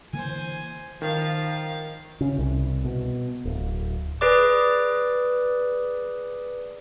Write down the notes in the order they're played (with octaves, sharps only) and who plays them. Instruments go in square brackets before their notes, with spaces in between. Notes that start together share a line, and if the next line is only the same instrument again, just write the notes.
[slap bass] D3 E3 A#3 [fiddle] C5 G#5
[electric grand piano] D#3 [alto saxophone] F3 [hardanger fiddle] F5
[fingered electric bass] C#3
C2
B2
D1
[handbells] G#4 B4 D5 D6